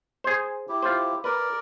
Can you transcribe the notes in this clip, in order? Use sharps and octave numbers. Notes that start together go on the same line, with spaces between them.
G#4 C5
E4 G4
F4 C5
A#4 B4 D5